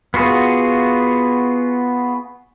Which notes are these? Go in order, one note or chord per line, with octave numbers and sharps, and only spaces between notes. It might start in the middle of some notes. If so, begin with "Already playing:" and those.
B3 F4 F#4 G#4